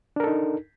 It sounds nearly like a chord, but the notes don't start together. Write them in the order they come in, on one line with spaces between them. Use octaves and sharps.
D4 A#4 A4 D#4